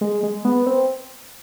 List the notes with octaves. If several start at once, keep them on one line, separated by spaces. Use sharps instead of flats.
G#3
G#3
B3
C4